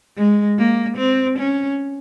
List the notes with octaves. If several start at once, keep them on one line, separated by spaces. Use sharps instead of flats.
G#3
A#3
C4
C#4